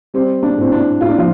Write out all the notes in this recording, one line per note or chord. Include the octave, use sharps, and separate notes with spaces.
G3 C4
D4
A2 C4
D4
A2 F4
D4
F3 F4